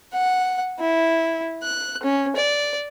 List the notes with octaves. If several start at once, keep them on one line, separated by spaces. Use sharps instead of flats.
F#5
E4
F#6
C#4
D5